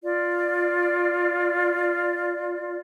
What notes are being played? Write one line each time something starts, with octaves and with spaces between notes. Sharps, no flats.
F4 D5